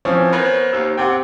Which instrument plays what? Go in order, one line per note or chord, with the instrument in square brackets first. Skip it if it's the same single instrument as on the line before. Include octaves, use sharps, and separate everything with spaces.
[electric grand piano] E3 F3 C4 [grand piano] C#4
[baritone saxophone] B3 [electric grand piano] A#4 C5 C#5
[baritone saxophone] D#2 [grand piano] E6
[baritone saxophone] C3 [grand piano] F#5 G5